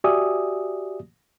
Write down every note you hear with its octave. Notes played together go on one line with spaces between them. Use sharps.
F#4 G4 D5 E5 G#5 D#6